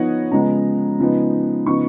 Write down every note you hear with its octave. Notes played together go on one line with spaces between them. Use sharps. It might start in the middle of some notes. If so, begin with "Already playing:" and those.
Already playing: F3 B3 D#4 C#5 D#5 F#5
C#3 F3 G#3 B3 A#5
C#3 F3 G#3 B3 D#4
C#3 F3 B3 D#4 C#6